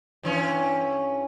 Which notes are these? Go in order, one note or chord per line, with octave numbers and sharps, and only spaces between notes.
G2 E3 C#4